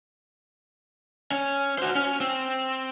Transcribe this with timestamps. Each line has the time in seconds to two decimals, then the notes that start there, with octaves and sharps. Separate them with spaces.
1.32 C#4
1.78 F#4 C5
1.95 C#4
2.21 C4